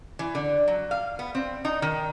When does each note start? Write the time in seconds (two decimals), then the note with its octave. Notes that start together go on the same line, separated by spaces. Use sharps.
0.19 E3
0.35 D3
0.68 F#3
0.91 F5
1.19 B3
1.35 C4
1.65 D#4
1.82 D#3